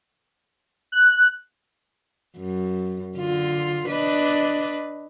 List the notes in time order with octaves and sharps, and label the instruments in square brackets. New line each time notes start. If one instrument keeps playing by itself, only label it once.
[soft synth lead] F#6
[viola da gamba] F#2
D3 F4
D4 B4 D#5